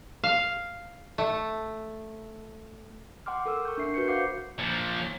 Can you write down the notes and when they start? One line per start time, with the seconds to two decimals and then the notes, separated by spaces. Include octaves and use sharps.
0.24 F5
1.18 A3
3.26 F#5 G5 C6 D6 F6
3.46 A4 A#4 E6
3.65 C#6 G6
3.78 D4 A#4 E5 C7
3.94 F#4 B4 G6 C#7
4.08 C5 F5 F#5 D6 G6 C7
4.59 A#2 F3